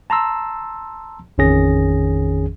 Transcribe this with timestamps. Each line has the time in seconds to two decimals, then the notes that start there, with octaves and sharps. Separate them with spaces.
0.10 A5 A#5 C6 E6
1.38 A1 F2 D#3 C#4 G#4 A#6